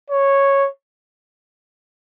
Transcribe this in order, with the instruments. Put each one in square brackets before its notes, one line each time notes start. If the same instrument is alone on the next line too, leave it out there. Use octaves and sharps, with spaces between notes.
[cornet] C#5